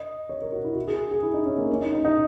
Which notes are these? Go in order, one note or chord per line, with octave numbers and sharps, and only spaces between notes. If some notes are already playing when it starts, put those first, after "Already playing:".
Already playing: D#5
C#5
A#4
F#4
E4
F#4
G#4
G#4
E4
D#4
C#4
A#3
C#4
D#4
D#4
D#4